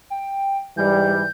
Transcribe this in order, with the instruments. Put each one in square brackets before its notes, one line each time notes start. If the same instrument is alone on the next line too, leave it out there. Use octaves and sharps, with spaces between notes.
[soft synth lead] G5
[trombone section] G#2 E3 G3 [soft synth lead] G6